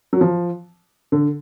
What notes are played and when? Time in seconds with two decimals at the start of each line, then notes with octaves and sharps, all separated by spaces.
0.13 F#3
0.21 F3
1.12 D3